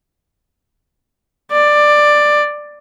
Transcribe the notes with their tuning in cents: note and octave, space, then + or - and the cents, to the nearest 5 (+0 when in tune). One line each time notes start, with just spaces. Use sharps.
D5 +10